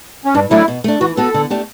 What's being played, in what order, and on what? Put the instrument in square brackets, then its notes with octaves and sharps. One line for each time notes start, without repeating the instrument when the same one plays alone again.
[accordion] C#4
[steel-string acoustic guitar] G2 [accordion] D4
[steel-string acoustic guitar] F#3 A3 D4 [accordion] E4
[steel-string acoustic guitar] B2
A3 D4
[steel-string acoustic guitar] E3 [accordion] F#4
[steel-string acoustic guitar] B3 F#4 B4 [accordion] A4
[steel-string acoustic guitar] D3
A3 D4 G4